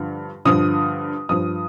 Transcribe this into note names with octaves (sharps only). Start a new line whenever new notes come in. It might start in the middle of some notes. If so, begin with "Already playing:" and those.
Already playing: G2 D3 F3
G2 D3 F3 D#6
G2 F3 D#6